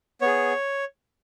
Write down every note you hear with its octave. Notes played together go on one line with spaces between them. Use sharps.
B3 G#4 C#5